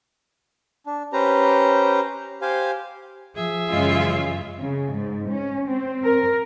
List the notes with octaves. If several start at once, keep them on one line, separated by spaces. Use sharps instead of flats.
D4
C#4 G4 B4 C5 A#5
G4 C5 F5 G#5
F3 G#4 E5
F#2 C#3 E3 G#3 F4
C#3
G#2
C#4
C4
A#4